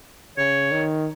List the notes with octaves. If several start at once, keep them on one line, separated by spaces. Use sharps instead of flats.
C#3 C#5
D#3